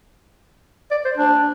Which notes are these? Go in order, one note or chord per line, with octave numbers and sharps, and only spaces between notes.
D5
C5
D4